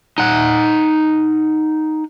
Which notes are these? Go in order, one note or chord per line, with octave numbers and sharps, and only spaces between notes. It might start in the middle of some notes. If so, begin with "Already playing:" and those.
D#4 F#5